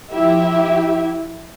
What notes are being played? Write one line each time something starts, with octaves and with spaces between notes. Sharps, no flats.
F3 E4 G4 E5